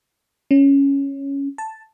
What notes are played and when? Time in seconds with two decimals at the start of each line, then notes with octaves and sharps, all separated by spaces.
0.51 C#4
1.58 A5